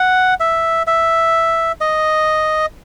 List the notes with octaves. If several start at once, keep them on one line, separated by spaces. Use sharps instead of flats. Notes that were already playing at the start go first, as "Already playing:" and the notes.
Already playing: F#5
E5
E5
D#5